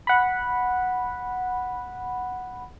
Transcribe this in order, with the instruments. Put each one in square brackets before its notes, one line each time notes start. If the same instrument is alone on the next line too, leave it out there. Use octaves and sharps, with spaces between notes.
[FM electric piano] F#5 B5